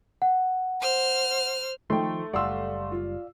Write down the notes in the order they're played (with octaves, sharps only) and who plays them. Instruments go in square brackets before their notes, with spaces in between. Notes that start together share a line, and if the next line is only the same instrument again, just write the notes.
[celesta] F#5
[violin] C5 F6
[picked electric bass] D#3 F3 [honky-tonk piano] A3 [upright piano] D#4 G5 [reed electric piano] C6
[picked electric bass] F#1 G3 [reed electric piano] D5 F5 [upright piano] F#5 C6 E6
[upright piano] F4